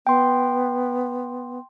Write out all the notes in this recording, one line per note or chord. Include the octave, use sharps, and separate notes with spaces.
B3 G5 C6